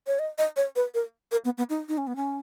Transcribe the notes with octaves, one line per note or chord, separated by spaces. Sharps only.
C#5
D#5
D#5
C#5
B4
A#4
A#4
B3
B3
D#4
D#4
C#4
B3
C#4